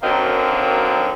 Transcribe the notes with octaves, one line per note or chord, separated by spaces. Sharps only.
F#2 D3 D#3 F#3 A#3 C4